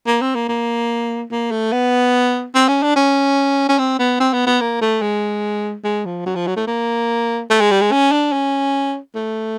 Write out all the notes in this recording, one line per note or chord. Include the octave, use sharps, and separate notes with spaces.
A#3
C4
A#3
A#3
A#3
A3
B3
C4
C#4
D4
C#4
C#4
C4
B3
C4
B3
B3
A#3
A3
G#3
G#3
F3
F#3
F3
F#3
A3
A#3
A3
G#3
G3
G#3
C#4
D4
C#4
A3